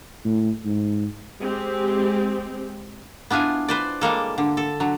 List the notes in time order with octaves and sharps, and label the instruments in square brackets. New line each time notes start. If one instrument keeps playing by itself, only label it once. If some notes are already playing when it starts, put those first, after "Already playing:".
[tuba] A2
G#2
[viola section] G#3 C4 G4
[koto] B3 D4 E4 F4 G#5
B4 C5 D5
G3 G#3 A#3 A4
D3
A4
D3 F#3